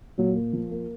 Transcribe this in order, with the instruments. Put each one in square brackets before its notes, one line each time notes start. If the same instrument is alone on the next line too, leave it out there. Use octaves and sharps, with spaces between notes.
[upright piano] A#2 [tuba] F#3
[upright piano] A#3
F3
A#3